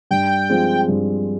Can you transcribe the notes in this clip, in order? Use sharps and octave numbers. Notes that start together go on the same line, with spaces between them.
G2 G5
F3 G#3 C4 F4
G2